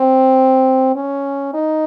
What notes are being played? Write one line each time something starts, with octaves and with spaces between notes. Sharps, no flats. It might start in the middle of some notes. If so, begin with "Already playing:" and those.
Already playing: C4
C#4
D#4